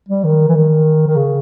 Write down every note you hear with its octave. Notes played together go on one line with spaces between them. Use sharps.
G3
D#3
E3
D#3
D#3
C#3